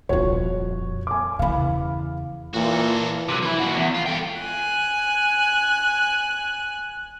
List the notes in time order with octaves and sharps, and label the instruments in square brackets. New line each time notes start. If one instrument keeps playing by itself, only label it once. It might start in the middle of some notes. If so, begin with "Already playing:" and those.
[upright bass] D#1 F2 [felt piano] F4 F#4 C#5
[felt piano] G#5 D6
[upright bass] E2 C#3 [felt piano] F5 B5
[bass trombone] A#2 [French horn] E3 [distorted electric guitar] F#4 A4
[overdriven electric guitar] C3 F#3
E3 E4
A#3 F#4
E2
F4
A4 G5
[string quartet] G#5 F#6